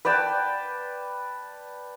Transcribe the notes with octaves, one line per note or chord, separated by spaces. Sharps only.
B4 D5 G5 A5